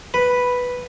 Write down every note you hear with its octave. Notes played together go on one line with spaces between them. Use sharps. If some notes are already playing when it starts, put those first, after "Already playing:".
B4